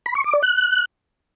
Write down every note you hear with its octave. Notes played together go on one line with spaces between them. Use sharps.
B5
C#6
D6
D5
F#6